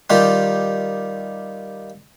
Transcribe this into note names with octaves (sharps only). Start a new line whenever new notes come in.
D#3 G3 F4 G4